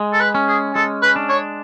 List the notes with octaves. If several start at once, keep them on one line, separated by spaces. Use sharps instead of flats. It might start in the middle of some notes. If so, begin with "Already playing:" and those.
Already playing: G#3
A4
B4
C#4
G#4
G#3 A4
B4
D4
C#5